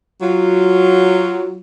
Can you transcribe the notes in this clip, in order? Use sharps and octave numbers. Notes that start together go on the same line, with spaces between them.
F#3 F4